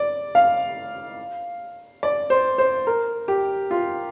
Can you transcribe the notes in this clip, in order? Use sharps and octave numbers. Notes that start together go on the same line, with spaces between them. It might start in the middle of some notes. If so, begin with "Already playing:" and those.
Already playing: D5
F5
D5
C5
C5
A#4
G4
F4